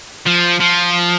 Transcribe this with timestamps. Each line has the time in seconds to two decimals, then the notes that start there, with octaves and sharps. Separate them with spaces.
0.26 F3
0.60 F3